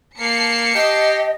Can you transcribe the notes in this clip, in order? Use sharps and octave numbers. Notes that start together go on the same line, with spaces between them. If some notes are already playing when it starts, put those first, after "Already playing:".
A#3 A5 C7 C#7
G4 D#5